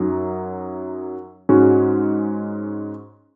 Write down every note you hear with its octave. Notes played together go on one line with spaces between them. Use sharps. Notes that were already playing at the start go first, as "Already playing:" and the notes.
Already playing: F#2 F#3 D#4
G#2 G#3 C#4 F#4